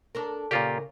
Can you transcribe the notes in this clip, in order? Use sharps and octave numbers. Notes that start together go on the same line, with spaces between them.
D4 A4 A#4
A#2 C#3 F4 G4 A#4 D5